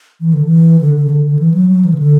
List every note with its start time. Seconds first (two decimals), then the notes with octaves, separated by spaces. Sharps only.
0.21 E3
0.33 D3
0.45 E3
0.81 D3
0.95 D3
1.05 C#3
1.10 D3
1.25 D3
1.39 E3
1.54 F#3
1.69 F#3
1.85 E3
1.94 C#3
1.98 D3